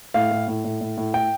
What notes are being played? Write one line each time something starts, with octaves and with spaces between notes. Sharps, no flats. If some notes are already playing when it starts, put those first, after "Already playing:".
A2 F5
A2
A2
A2
A2
A2
A2 G5